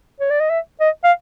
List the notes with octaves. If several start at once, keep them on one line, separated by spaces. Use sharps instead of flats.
C#5
D5
D#5
E5
D#5
F5